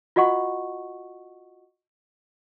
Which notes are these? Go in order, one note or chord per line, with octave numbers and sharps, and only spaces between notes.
F4 F#4 D#5 F#5 C#6